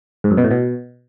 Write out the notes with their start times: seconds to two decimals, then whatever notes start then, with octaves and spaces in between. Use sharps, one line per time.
0.24 G#2
0.31 F#2
0.37 B2
0.44 A2
0.51 B2